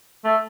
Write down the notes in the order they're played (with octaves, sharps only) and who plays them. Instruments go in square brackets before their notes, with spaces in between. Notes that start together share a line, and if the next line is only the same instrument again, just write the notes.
[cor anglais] A3